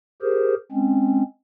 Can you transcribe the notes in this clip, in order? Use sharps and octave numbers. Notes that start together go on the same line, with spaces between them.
G4 G#4 A#4 C5
G#3 C4 C#4